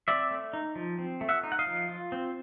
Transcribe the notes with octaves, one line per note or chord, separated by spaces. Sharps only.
C4 D5 E5
A3
D#4
F3
C4
A3
E5 F#5
D#4
F#5
D#5 F5
F3
F4
C4